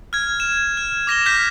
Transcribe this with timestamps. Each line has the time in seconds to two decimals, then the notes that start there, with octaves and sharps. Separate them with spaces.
0.13 F6 G#6
0.40 E7
0.77 F6
1.07 D6 A#6 E7 G7
1.26 F6 G6 A#6 B6